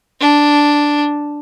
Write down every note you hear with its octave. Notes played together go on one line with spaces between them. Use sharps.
D4